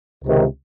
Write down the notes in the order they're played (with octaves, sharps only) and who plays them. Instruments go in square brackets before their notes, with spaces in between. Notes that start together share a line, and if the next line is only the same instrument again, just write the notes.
[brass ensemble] C#2 C3 D#3